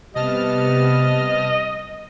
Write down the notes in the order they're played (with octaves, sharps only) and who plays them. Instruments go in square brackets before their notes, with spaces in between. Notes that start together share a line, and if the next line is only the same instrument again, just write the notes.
[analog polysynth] C3 A5 F6 [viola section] G3 B3 [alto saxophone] D#5